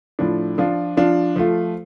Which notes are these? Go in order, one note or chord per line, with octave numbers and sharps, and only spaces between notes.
A2 F3 D4
F3 D4 F4
F3 D4 F4
F3 A3 F4